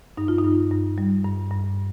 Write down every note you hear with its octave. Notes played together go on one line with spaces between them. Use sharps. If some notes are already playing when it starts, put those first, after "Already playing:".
G2 D#4
F4
D#4
G2
G2
G3
G2
G2